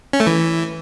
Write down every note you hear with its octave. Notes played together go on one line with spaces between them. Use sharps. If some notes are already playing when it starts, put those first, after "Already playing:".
C#4
A3
E3